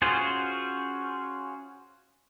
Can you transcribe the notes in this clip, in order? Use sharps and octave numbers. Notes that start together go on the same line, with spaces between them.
C#4 F4 F#4 G#4 C5